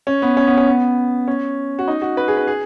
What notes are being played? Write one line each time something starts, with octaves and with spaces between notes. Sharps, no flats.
C#4
B3
C#4
B3
C#4
B3
C#4
F#4
D#4
F#4
B4
G#4
B4
G#4